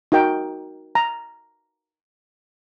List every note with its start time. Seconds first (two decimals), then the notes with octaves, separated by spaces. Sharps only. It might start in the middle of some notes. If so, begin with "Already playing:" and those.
0.12 D#4 F#4 A#4 G5
0.95 A#5